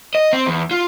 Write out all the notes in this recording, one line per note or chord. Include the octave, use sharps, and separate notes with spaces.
D#5
C4
E2
F4